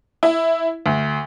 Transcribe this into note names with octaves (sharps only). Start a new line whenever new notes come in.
E4
D2